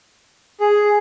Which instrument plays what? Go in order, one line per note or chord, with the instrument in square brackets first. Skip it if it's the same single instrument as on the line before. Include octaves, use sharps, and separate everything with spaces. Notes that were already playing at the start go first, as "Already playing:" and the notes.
[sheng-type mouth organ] G#4